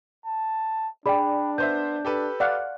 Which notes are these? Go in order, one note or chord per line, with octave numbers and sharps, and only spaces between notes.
A5
D4 G#4 D5 G5 B5
B3 C5 E5 G6
G4 A4 B4
D5 F5 F#5